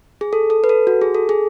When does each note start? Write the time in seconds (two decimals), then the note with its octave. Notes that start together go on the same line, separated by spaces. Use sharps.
0.21 G#4
0.33 A4
0.50 A4
0.64 B4
0.69 A4
0.87 F#4
1.01 G#4
1.15 A4
1.29 G#4